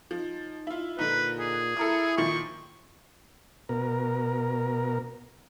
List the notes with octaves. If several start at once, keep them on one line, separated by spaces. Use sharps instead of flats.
F3 D#4
E4 F4
A#2 D3 D#4 B4
G#4
E4 A4 A#4 D#6
A#2 D#3 F3 C#6
B2 A#4